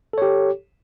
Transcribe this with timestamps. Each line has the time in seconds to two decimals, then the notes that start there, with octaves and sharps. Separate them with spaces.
0.13 A4
0.18 C#5
0.22 G4